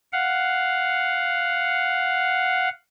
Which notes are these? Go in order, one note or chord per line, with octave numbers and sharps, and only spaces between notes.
F5 F#5